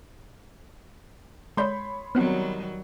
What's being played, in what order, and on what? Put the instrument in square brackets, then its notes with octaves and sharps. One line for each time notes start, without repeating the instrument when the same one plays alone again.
[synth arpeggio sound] G#3 G6 [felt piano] C#5 B5 C6
[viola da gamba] D#3 F#3 G3 [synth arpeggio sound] B3 C4 F#4